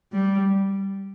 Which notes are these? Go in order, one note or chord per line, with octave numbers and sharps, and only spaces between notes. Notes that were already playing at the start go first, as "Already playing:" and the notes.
G3